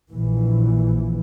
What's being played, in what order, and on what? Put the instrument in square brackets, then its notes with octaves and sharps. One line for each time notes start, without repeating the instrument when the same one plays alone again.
[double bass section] A#1 E3